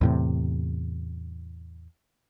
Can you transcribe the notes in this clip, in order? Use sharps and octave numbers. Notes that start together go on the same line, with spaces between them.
E2 A2 C3